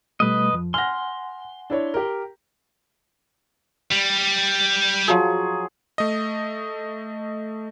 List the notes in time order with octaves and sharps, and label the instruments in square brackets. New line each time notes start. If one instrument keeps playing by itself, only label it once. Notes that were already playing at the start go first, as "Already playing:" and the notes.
[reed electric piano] B2 G3 A3 [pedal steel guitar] B4 D#5
[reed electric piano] F2 F3
[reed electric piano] F#5 G#5 [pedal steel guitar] C6 [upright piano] F6 A#6
[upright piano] D4 E4 C#5
G4 A#4
[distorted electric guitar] G3
[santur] F3 F#3 G#4
[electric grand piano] A3 D#5